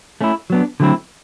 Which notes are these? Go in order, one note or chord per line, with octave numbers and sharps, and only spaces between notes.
A3 C#4 E4
F#3 B3 D4
D3 F#3 A3 C4 E4